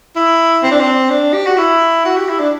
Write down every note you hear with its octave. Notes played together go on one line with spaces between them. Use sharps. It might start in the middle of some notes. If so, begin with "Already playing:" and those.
E4
C4
D4
C4
D4
G4
F#4
E4
F#4
G4
E4
D4